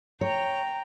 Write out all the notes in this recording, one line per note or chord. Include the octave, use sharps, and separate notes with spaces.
C#5 G5 A#5